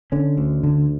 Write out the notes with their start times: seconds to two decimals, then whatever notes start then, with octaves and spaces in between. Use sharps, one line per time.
0.12 D3 C#4
0.38 D2
0.64 D3